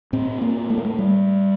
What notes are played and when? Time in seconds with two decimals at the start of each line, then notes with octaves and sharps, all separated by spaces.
0.13 A2 C4
0.41 A#3
0.70 A3
0.78 A#3
0.85 A3
0.99 G3